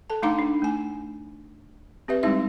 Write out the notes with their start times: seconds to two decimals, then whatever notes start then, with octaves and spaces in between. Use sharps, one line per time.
0.10 A4 A5
0.22 A3 D4 D#4 F5 A#5 D6
0.39 D4
0.62 A3 G#5
2.08 C4 G4 B4 E5
2.23 G3 G#3 C4 D#4 E4 E5